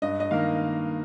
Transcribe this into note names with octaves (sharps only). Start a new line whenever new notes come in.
G2 D#5
D#5
D#3 A#3 F5